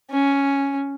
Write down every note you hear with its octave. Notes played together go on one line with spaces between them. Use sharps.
C#4